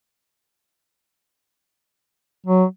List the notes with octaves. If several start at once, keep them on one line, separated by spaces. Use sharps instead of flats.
F#3